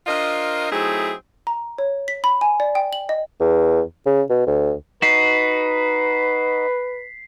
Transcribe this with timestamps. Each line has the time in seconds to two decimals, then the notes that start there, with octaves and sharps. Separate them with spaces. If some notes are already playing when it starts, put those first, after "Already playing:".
0.06 D4 F4 A#4 C5 D#5
0.70 F#3 A3 C4 D#4 E4 G#4
1.47 A#5
1.78 C#5
2.08 B6
2.24 B5
2.41 G#5
2.60 D5
2.75 G5
2.93 F#7
3.09 D#5
3.40 E2
4.06 C#3
4.30 B2
4.46 D2
5.02 D#4 F#4 B4 B6 C7